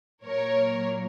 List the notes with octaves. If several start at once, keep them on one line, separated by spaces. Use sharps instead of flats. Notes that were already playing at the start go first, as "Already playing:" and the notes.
A#2 F#3 A#3 A#4 C#5